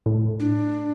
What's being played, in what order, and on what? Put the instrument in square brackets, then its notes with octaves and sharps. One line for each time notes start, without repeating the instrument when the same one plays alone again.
[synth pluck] A2
[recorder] D4